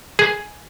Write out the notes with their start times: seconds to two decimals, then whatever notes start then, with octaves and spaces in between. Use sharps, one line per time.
0.19 G#4